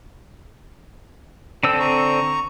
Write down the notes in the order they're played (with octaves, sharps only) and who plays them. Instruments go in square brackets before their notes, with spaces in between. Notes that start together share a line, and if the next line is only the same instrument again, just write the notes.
[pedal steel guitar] D3 C4 E6 [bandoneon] A4
[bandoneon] A#5 C#6